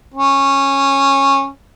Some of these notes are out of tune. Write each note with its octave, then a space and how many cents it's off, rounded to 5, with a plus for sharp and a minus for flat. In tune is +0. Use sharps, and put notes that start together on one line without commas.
C#4 -15